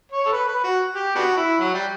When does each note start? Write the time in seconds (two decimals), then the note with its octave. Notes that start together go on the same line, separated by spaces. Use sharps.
0.12 C#5
0.25 A4
0.32 B4
0.47 B4
0.64 F#4
0.96 G4
1.16 B3 D4 F#4
1.37 E4
1.59 F#3
1.74 G3